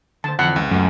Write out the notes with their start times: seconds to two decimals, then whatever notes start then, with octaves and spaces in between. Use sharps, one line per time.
0.24 D3 C5 A5
0.39 F2 D3 E3 F#5
0.56 C#2
0.71 F#2 A3